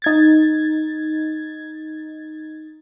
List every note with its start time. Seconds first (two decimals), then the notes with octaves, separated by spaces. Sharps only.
0.02 D#4 G#6 A6